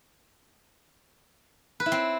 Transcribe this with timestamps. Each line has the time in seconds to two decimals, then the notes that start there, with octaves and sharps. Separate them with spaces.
1.80 B4
1.86 E4
1.92 C4